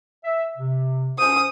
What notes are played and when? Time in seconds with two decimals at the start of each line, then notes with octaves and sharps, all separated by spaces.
0.24 E5
0.58 C3
1.19 C#4 C5 D#6